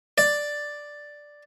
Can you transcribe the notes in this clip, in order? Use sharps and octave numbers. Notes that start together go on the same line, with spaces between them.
D5